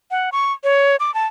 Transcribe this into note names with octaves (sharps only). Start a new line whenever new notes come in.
F#5
C#6
C#5
D6
A5